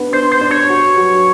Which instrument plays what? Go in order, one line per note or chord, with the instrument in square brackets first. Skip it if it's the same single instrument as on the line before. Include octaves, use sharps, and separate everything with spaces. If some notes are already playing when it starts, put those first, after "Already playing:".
Already playing: [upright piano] B3 D4
[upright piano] D4 [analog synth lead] C5
[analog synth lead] C5
[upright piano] D4
[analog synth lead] C#5
[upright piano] F#4
F#3